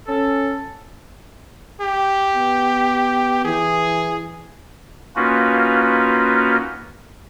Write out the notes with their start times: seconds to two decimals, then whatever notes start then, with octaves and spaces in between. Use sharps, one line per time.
0.08 C#4 A4
1.81 G4
2.34 B3
3.45 E3 G#4
5.16 A#3 C#4 D#4 F4 F#4 B4